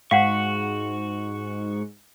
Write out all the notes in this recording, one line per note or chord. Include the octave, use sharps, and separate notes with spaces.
G#2 F#4 F5 F#5 C#6